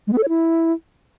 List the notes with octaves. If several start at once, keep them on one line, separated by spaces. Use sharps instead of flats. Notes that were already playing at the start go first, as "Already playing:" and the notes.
G#3
B3
A4
C#5
E4